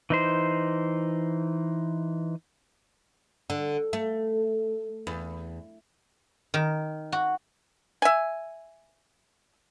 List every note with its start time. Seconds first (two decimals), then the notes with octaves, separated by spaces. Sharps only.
0.10 E3 D#4 C5
3.50 D3
3.93 A3
5.07 E2
6.54 D#3
7.12 F#4
8.02 E5 G#5